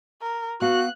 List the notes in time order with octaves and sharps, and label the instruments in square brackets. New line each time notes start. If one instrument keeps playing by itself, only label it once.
[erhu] A#4
[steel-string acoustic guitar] B3 F5 [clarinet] F#4 [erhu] F#6